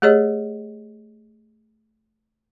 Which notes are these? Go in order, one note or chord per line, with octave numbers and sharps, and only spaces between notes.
A3 G4 G#4 C#5 D#5